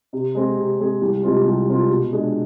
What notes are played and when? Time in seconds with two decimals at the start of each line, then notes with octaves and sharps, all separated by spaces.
0.13 C3
0.35 G#3 C4 G#4
0.57 C3
0.79 G#3 C4 G#4
1.01 C2
1.23 C3 G#3 C4 F4
1.46 C2
1.68 C3 G#3 C4 F4
1.90 B2
2.12 G#3 D4 G#4